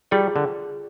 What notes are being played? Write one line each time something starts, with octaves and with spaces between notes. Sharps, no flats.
G3 F4 G#4 D5
D3